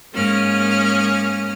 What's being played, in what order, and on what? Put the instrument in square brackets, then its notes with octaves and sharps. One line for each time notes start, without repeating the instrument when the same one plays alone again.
[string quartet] G#2 A#3 C#4 D#6 F6